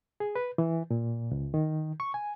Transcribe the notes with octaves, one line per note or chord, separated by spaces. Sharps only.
G#4
B4
E3
A#2
C#2
D#3
C#6
G#5